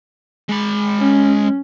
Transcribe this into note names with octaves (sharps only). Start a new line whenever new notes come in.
G#3 B5
C#4